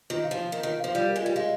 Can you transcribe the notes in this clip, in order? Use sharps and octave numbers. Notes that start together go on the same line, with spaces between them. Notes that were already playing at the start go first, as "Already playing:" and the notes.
D#3 F4
F5
F3
F4
D#3 A#4
D#3
F4
F3 F5
G3 F4
A#4
G#3
G3 F4
G#3 F5